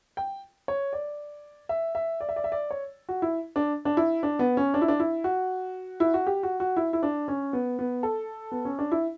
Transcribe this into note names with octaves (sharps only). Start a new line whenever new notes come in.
G5
C#5
D5
E5
E5
D5
E5
D5
E5
D5
C#5
F#4
E4
D4
D4
E4
D4
B3
C#4
D4
E4
D4
E4
F#4
E4
F#4
G4
F#4
F#4
E4
E4
D4
C#4
B3
B3
A4
B3
C#4
D4
E4